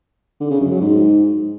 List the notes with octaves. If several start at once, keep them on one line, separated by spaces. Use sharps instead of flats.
D3
C#3
F#2
F#3
G#2